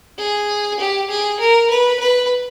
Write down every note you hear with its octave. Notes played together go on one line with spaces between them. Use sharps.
G#4
G4
G#4
A#4
B4
B4